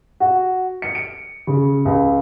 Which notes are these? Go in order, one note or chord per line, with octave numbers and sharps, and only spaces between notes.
F#4
C#7
D7
C#3
C#2